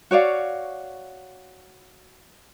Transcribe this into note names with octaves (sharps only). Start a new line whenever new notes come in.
F#4 C#5 D5 F5